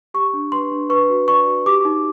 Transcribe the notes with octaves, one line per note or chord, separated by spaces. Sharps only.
G4 C#6
D4
B4 C6
D4
B4 C#6
F#4
D5 C#6
F#4
G4 D6
D#4